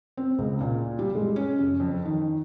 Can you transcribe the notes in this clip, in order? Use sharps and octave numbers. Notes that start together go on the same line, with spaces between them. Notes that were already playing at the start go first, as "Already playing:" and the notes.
C4
C#2
A#2
G3
G#3
C#4
F#2
F2
D#3